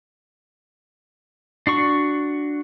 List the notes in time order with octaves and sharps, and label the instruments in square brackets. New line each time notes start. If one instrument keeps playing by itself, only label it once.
[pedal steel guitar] D4 F#4 C#6